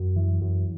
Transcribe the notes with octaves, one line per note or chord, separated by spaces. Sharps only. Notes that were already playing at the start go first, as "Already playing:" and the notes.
Already playing: F#2
E3
F#2